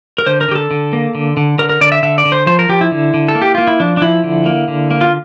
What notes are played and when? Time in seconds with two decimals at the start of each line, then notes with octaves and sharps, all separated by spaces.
0.18 A#4
0.27 D3 C5
0.41 A#4
0.48 D3 G4
0.55 A4
0.71 D3
0.93 A#3
1.15 D3
1.37 D3
1.58 D3 A#4
1.69 A#4
1.81 D3 D5
1.92 E5
2.03 D3 E5
2.18 D5
2.25 D3
2.32 C5
2.46 F3 C5
2.59 A#4
2.69 F3 G4
2.81 E4
2.92 D3
3.14 D3
3.28 A4
3.35 A#3
3.42 G4
3.55 A#3 F4
3.67 E4
3.80 F3 D4
3.97 D4
4.01 F3 E4
4.24 D3
4.46 A#3
4.68 D3
4.91 A#3
5.01 F4